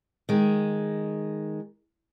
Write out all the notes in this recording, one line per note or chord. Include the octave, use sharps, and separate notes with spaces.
D#3 G#3